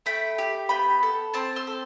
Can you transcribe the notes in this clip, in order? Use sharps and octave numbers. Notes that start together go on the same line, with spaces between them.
A3 G5 B5
G4
B3 G5 B5
A4
C4 A5 C6
C6 E6
A4